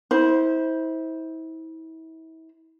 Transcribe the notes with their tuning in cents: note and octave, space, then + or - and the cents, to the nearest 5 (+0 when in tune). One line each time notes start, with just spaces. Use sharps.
E4 -35 C5 +0